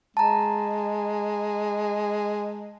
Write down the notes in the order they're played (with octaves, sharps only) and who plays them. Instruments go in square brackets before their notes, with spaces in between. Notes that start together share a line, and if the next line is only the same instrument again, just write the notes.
[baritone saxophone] G#3 [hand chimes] A5 A#5